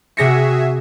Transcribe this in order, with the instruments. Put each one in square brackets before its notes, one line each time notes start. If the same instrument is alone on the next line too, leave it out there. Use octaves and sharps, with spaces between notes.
[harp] C3 A#6 C#7 [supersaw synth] F#4 G#4 E5